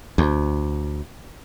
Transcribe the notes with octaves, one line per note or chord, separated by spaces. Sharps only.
D2